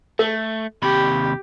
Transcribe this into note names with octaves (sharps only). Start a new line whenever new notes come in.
A3 A4
D#2 C3 G4 B5